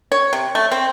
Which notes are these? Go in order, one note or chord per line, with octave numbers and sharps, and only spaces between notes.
C#5
C3
A3
C4